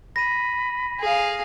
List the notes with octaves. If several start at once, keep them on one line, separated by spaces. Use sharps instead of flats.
B5 A#6 D#7
G#4 F5